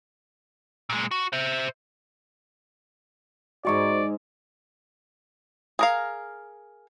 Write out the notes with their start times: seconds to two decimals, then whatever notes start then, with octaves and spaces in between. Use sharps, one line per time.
0.90 A#2 G#3
1.11 F#4
1.33 C5 E5
3.65 G#2 G#3 F#4 D5 G#5 C#6
5.79 G#4 A#4 F5